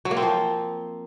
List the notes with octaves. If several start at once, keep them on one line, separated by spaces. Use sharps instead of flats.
F#3
A#3
C4
F3